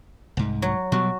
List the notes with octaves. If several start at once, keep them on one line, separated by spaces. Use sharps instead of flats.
C2 G#2
F#3
B2 F#3 G3 F#4